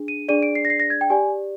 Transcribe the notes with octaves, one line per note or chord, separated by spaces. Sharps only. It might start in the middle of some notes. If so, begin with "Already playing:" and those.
Already playing: D4 G#4
D#7
D4 G#4 D5 D#7
D7
C7
A#6
C7
A#6
G#6
G5
G4 D5 G#5